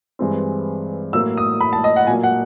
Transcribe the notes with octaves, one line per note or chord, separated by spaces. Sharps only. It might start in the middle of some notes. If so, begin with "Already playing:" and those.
G2 E3 G#3 C4
A2 F#3 A#3 E6
D#6
B5
A5
D#5
F#5
A#2 F#3 A#3 G#5
F#5